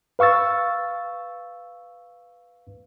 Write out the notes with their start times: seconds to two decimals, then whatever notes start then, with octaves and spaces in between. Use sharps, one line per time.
0.19 B4 F5 C#6 E6 A6